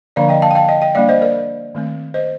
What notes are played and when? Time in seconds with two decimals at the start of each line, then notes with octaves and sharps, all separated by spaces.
0.16 D3 F3 A#3 D4 D5 F5
0.29 D#5 G5
0.42 F5 A5
0.51 G5
0.55 F5 A5
0.68 D#5 G5
0.82 D#5 G5
0.95 G3 A#3 D4 D5 F5
1.09 C5 D#5
1.21 A#4 D5
1.75 D#3 A3 C4
2.14 C5 D#5